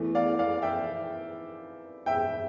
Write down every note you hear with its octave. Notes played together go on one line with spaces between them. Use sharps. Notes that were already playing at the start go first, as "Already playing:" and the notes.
Already playing: E2 E3 A3
D5 F5
D5 F5
E5 G5
E5 G5